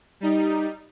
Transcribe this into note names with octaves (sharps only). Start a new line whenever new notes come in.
G3 D#4